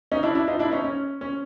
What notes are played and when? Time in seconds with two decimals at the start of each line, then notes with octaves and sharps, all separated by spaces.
0.12 C#4 D#4
0.23 D4 E4
0.35 D4 E4
0.48 D#4 F4
0.59 D4 E4
0.71 C#4 D#4
0.84 C#4
1.21 C#4